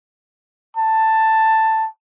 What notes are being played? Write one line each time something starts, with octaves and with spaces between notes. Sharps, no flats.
A5